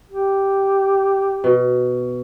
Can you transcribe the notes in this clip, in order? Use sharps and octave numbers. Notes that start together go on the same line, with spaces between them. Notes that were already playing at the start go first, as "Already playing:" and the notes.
G4
B2